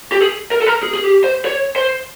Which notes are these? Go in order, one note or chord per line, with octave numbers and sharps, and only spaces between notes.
G4
G#4
A#4
A4
A#4
G#4
G#4
G4
C5
C#5
C5